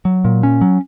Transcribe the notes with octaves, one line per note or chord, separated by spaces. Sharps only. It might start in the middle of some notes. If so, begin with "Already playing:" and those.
F#3
A#2
C#4
F#3